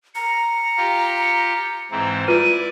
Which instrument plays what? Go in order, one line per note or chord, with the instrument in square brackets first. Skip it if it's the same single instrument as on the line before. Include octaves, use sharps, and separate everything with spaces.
[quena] A#5 [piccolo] C#7
[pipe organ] F4 G4
[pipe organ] G#2 E3 C4 [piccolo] A#5
[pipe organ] E4 D5 [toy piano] F4 B4 A#5 [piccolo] D#7